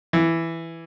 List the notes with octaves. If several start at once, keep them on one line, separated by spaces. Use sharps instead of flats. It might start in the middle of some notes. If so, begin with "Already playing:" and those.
E3